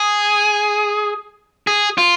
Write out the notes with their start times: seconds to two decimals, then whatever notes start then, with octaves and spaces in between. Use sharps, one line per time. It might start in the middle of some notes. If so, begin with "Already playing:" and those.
Already playing: G#4
1.67 G#4
1.98 F4